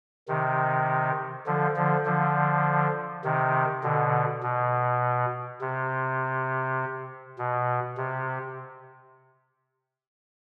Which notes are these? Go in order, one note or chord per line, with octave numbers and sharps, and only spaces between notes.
C3 D#3
D3 F3
D3 F3
D3 F3
C3 D#3
B2 D3
B2
C3
B2
C3